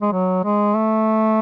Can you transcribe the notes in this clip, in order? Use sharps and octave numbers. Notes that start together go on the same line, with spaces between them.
G#3
F#3
G#3
A3